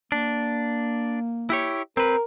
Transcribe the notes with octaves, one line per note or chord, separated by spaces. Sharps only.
A#3 D4
E4 G4 C#5
C4 A#4 B4